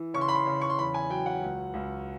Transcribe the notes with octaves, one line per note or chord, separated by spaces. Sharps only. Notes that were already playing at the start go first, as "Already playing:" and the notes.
Already playing: E3
C#3 C#6
C6
B5
C6
C#3
C#6
C6
E2 B5
G#5
F#3 G5
F#5
C#2
C#2